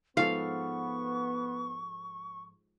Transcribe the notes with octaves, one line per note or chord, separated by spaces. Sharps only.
G#2 F3 B3 A4 F5 C#6